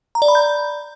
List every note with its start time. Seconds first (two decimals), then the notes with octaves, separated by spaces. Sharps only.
0.15 A#5
0.22 D5
0.28 B5
0.35 G6